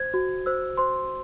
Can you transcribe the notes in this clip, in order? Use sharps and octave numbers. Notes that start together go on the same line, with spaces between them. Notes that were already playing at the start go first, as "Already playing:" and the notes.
Already playing: C5 G#6
F#4
C5 E6
C5 C6